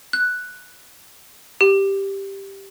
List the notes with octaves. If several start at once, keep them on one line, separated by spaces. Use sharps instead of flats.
F#6
G4